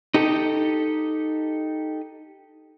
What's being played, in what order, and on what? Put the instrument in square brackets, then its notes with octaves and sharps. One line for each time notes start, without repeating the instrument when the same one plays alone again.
[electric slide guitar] D#4 G4 A4